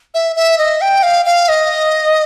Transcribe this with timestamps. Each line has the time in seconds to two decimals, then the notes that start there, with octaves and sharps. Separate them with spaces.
0.14 E5
0.36 E5
0.58 D#5
0.81 G5
1.03 F5
1.25 F5
1.48 D#5